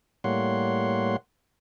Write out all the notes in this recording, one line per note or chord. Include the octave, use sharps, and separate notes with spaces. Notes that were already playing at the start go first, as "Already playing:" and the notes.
A2 G3 A#3 C#5 F#5 C6